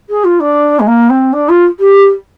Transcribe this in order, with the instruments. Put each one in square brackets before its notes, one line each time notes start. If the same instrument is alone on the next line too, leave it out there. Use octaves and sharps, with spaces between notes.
[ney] G#4
F4
D4
G#3
A#3
C4
D4
F4
G4